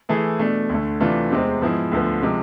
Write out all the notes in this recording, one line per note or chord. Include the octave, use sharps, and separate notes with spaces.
E3 A3 E4 G#4
B2 A3 D4
D2 D3 A3
C3 E3 A3 D4 F4
E2 C3 G#3 C4
G#2 F3 B3 E4 G#4
D2 D3 F3 B3
C3 F3 G#3